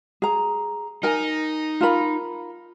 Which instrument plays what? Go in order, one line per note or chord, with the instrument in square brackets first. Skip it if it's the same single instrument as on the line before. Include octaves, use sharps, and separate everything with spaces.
[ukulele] G#4 A#5
[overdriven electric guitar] D#4 [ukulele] A#4 G#5
[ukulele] F4 A#4 B5